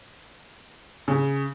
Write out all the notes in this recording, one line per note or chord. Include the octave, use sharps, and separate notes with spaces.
C#3